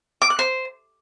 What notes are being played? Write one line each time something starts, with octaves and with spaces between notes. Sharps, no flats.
D6
F#6
C5